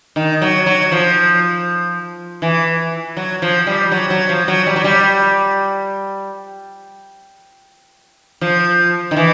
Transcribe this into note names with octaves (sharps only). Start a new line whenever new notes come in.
D#3
F#3
F#3
F3
E3
F#3
F3
G3
F#3
F#3
F3
F#3
G3
F#3
G3
F3
D#3
E3